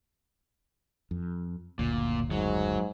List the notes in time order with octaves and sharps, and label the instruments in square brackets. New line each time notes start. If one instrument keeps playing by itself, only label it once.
[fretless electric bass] F2
[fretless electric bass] F#1 D2 [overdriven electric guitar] A#2
[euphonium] G#2 [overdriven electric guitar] F#3